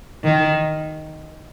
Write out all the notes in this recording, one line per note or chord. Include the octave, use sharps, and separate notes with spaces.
D#3